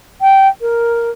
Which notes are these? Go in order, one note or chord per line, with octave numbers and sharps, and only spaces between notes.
G5
A#4